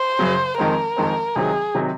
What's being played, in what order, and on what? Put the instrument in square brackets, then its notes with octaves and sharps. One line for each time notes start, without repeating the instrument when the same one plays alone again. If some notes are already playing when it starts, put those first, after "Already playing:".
Already playing: [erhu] C5
[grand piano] F#2 C#3 F#3
[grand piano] F2 D#3 G#3 C4 [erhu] A#4
[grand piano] F2 D#3 G#3 C4
[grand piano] C#2 C3 D#3 F#3 C4 [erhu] G#4
[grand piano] C3 D#3 F#3 C4